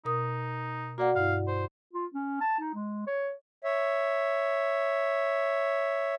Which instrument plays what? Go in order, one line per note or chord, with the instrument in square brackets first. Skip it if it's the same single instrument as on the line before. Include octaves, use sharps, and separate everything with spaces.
[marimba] B2 A#4 D#6 [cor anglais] D#4
[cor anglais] A#3 [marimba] F#4 D5 F#5
[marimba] G2 E4 [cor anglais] F5
[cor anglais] C5
[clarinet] F4
C#4
A5
D#4
G#3
C#5
[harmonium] C#5 E5